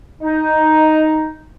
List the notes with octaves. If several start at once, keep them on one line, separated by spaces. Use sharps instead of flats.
D#4